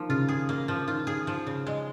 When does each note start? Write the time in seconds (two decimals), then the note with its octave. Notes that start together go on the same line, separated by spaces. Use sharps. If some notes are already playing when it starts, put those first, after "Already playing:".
Already playing: D#3 F3 A#3
0.09 C#3 F4
0.29 G#4
0.49 A#3
0.68 F3
0.88 D#3 F4
1.07 G#4
1.27 F3
1.47 C#3
1.67 G#3